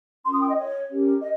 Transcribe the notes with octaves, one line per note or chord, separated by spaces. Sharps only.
C#4 F4 A#4 C6
D#6
G5
D#5
C#5
C#4 G4 A#4
D#5